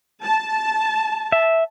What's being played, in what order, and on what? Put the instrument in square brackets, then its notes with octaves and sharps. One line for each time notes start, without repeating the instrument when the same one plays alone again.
[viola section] A5
[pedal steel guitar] E5